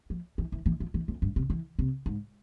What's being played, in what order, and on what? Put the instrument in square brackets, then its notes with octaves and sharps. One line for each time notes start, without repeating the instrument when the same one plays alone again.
[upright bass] F3
E3
E3
E3
F3
E3
F2
G2
C3
E3
C3
G#2